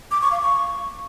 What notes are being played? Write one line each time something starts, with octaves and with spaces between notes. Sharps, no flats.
D6
C#6
F5
C#6